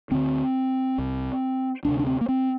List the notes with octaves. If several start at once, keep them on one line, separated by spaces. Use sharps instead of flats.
D2 D3 C4
C2 C3
D2 C3 D4
D4
C4
A#3
C4